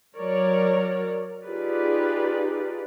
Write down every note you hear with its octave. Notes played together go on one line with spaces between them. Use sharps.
F#3 A#4 C#5 D5
D#4 F4 G4 G#4 B4 D5